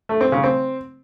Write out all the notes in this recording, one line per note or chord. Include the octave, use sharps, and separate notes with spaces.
A3
C4
C#3
C4